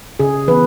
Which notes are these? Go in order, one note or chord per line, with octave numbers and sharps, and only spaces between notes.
C#3 G#4
E3 B3 B4